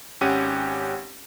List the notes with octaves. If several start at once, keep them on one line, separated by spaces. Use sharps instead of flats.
G#1 C#4 G4 F#5 D#7